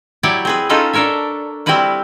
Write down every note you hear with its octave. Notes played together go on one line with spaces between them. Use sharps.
F#3 E4 G4 C#5 D5
C4 G#4 B4
C#4 D#4 F4 A4 B4 D#5
D4 A4 A#4 C#5 E5
G3 C4 E4 F#4 B4 F#5